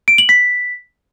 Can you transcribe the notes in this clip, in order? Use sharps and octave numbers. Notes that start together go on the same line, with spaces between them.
D7
F#7
B6